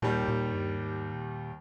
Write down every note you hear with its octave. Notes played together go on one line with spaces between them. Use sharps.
D#2 A#2 D#3 G3
A#2
G2
G#2
A#2